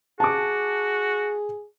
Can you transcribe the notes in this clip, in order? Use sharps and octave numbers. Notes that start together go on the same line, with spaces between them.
F#4 G#4 A5 D6